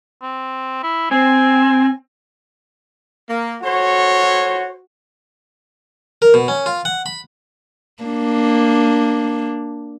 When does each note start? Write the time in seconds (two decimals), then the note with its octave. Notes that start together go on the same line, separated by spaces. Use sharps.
0.22 C4
0.83 E4
1.11 C4 G#5
3.29 A#3
3.64 F#4 A4 C5 C#5
6.22 A#4
6.34 B2
6.48 C#4
6.66 F4
6.85 F#5
7.06 B5
8.03 A#3 D4